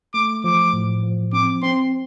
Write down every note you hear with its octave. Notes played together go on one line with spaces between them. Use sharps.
A3 D6
F3 D6
A2
F3
C4 D6
C4 C6